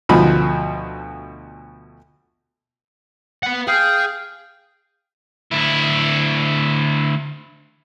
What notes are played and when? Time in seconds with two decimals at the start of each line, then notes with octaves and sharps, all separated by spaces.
0.09 D2 B2 F3 B5
3.43 B4 F#5
3.68 G#4 F5 G5
5.51 D2 E4